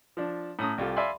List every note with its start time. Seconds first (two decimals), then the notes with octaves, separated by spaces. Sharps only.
0.17 F3 D4
0.59 A2 C#4 A#5 D#6
0.78 C2 F4 G4 A4
0.96 D5 E5 F5 G#5 B5 C6